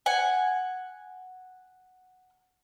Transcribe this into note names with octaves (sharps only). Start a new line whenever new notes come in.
F#5 G#5